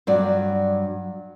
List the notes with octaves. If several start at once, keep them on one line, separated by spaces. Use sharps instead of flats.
G2 F#3 D5